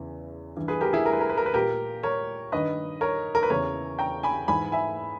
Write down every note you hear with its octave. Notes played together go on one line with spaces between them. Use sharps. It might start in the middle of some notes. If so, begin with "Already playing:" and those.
Already playing: E2 C#3 E3
G2 E3
G#4 B4
G4 A#4
E4 G#4
A#4
B4
A#4
B4
A#4
B4
A#2 G4 A#4
A#4 C#5
G2 D#3 B4 D#5
A#4 C#5
A#4
B4
E2 C#3 E3 A#4 C#5
G5 A#5
G#5 B5
G#2 E3 G#5 B5
E5 G#5